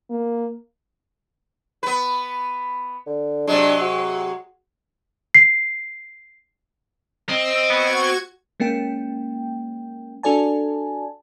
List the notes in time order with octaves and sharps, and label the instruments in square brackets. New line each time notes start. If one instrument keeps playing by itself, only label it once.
[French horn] A#3
[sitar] B3 B4
[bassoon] D3
[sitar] C3 F#3 G#3 [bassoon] D4
[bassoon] F#4
[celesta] C7
[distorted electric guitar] C4 [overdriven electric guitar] D#5 [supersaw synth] E6
[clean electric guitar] B3 [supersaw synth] F#4 C#6 G#6
[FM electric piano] G#3 A#3 C#4 G5
D4 F#4 A4 D5 G#5 A5